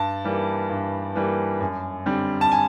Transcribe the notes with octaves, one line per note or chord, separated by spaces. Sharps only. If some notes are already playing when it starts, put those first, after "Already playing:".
Already playing: G2 A5
E3 G3 A#3
G2
E3 G3 A#3
F#2
D3 G3 C4
A5
G#5